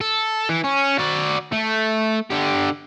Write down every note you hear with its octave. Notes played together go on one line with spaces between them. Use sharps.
A4
E3
C#4
F#4 D5
A3
D3 G4